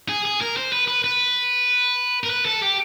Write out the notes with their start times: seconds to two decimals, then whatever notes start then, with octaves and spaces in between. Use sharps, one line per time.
0.09 G#4
0.25 G#4
0.41 A#4
0.57 C5
0.72 B4
0.88 B4
1.04 B4
2.24 A#4
2.30 B4
2.45 A4
2.62 G4